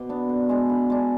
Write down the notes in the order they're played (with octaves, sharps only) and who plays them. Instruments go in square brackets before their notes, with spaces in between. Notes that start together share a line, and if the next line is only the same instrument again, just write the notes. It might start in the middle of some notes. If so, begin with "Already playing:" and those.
Already playing: [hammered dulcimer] B2 C6 D6
B3 D4
D3
G#3 D4
D3 B5
G#3 D4